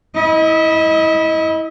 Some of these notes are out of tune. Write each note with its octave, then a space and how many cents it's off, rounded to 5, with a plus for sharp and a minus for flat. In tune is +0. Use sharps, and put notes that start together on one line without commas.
E4 -20 D#5 +20